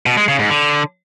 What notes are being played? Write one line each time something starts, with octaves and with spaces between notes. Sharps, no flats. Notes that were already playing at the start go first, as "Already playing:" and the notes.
B2
G#3
C#3
G#2
D3